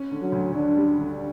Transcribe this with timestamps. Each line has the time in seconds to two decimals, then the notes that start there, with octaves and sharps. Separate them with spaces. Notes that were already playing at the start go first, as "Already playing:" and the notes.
Already playing: C#4
0.12 D3
0.22 F#3
0.32 D2
0.54 D3 D4
0.76 G3
0.98 D3